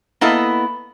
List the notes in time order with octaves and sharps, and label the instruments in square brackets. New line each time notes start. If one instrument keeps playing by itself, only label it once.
[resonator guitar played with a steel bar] A#3 B3 E4 A4 D#5